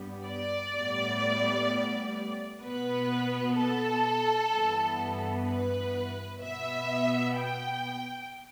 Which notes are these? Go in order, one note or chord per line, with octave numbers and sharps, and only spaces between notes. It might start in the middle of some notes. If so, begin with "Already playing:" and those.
Already playing: G2 G3 B3
D5
A2 G3 B3
B2 B3 B4
A4
G2 E3 B3
B4
B2 B3 E5
G5